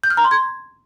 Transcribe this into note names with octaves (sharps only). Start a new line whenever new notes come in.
G6
F6
A#5
C6
G#6